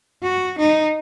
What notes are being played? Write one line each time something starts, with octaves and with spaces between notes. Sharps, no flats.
F#4
D#4